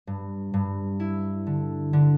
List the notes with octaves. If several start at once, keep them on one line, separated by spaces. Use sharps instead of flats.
G2
G2
E4
D3
D3